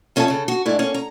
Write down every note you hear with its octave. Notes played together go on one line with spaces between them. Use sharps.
F2 C#4 A4 E5 F#5 A5
C#3 A4
F#4
G#2 A3 D4 E4
A#3 C#4
A#5